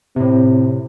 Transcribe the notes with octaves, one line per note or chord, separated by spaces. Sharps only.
A2 C3 C4